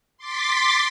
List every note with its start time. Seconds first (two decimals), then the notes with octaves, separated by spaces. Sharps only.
0.18 C6 D6 A6 B6